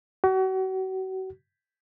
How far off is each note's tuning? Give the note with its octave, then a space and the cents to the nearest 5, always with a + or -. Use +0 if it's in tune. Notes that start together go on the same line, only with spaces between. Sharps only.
F#4 +35